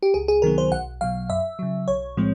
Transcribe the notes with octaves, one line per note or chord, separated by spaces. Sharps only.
G4
C#2 G#4
G#4
C3 D#3 F#3 B3 A#4
C5
B1 F#5
B2 F#3 F5
F#2 E5
C#3 F#3
B1 C#5
A2 F3 G#3 C4